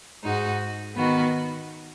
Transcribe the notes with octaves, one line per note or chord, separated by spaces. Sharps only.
G#2 G#3 D#4 F#4
D#3 B3 F#4 B4